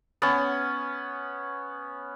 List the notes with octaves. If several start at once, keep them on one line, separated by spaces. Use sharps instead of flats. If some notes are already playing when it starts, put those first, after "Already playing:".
B3 C#4